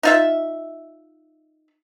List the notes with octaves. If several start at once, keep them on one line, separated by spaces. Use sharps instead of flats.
D#4 F4 E5